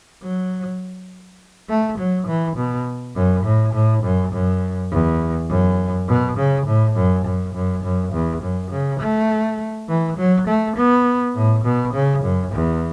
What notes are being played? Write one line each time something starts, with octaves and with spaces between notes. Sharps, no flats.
F#3
A3
F#3
E3
B2
F#2
A2
A2
F#2
F#2
E2
F#2
B2
C#3
A2
F#2
F#2
F#2
F#2
E2
F#2
C#3
A3
E3
F#3
A3
B3
A2
B2
C#3
F#2
E2